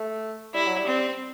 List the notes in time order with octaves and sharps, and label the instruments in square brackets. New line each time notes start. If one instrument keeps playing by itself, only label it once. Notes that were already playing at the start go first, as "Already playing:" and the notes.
Already playing: [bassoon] A3
[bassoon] G3 [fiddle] E4
[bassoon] F#3
G3
[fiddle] C4